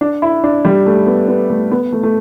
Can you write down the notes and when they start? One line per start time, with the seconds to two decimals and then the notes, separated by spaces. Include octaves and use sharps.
0.01 D4
0.22 E4
0.44 D4
0.65 G3
0.86 A3
1.06 B3
1.28 B3
1.50 A3
1.71 B3
1.92 A3
2.03 A3